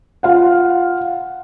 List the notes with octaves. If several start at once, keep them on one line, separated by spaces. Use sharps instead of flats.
F4 F5 F#5